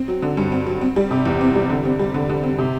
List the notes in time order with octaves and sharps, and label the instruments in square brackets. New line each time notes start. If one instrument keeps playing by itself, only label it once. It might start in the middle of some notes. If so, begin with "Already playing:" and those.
Already playing: [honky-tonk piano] C4
F#3
D3
G2
C4
F#3
C4
G3
C3
E2
C4
G3
D3
C4
G3
D3
D3
C4
C3